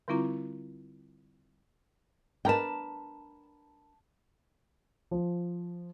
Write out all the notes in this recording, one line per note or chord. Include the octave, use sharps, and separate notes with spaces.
D3 G3 C4 E4 F4 A#5
D4 A#4 B4 G5 A5
F3